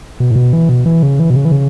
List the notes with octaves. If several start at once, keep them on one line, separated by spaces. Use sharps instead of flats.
B2
A2
B2
E3
B2
E3
C#3
E3
B2
C#3
E3
C#3